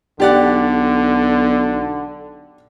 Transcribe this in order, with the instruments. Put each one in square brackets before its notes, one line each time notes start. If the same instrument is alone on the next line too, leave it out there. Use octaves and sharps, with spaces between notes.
[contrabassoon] B1 [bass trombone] D3 [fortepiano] G4 D5 F#5